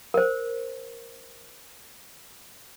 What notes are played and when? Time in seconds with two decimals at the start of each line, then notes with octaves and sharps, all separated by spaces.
0.14 A#4 C5